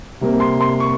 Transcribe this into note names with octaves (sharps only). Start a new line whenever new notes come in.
C3 G3 A#3
C6
C6
C#6